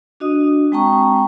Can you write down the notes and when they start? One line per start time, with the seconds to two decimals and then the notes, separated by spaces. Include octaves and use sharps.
0.20 D4 F#4 D#5 D#6
0.72 G#3 C4 G5 A5 A#5 C#6